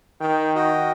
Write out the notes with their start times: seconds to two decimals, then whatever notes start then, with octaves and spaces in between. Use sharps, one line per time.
0.21 D#3 G5
0.55 F#4 D#5 G5